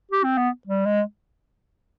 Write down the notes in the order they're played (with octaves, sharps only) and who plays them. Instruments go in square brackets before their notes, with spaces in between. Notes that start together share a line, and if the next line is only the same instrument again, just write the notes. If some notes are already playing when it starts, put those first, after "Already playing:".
[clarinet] G4
C4
B3
G3
G#3